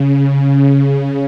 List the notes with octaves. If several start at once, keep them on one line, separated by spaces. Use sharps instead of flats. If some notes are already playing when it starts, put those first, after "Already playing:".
Already playing: C#3